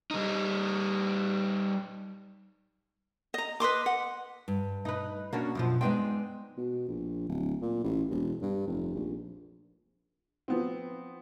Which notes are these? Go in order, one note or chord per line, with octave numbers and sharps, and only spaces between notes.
G3 D#4
D#5 A#5
B4 D#5 C6 D6
F#5
G2
D#4 B4
A#3 C#4 D4 F#4
F#2 B2 F3
G#3 B3 C4 D4 D#4 G5
B2
A#1
D1
A#2
A1
E1
G2
F1
A#1
F3 B3 C4